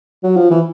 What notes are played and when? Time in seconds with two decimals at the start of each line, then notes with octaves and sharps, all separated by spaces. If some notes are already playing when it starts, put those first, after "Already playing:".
0.23 F#3
0.36 F3
0.50 E3